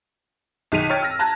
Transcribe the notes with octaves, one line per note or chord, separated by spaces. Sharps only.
B1 D#3 G#4 B6 D#7 F7
C#5 G5 F6 A6
E6 F6 A#6
A5 A#5 F#6 G#6 A#6